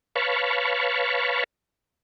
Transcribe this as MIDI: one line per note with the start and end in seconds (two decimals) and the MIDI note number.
0.16 1.44 71
0.16 1.44 73
0.16 1.44 77
0.16 1.44 81
0.16 1.44 83
0.16 1.44 85